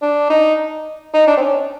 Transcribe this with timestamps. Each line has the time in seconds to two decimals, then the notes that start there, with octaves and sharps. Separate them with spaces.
0.02 D4
0.30 D#4
1.14 D#4
1.27 D4
1.37 C4
1.41 C#4